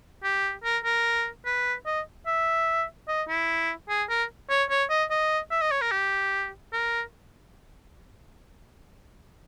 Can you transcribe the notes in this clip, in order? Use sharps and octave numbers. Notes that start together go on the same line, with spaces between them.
G4
A#4
A#4
B4
D#5
E5
D#5
E4
G#4
A#4
C#5
C#5
D#5
D#5
E5
D#5
C#5
A#4
G4
A#4